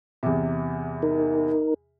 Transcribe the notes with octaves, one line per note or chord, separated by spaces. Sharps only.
E2 C3
D#4 A#4